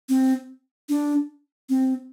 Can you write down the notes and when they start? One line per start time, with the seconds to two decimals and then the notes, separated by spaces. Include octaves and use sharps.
0.09 C4
0.89 D4
1.69 C4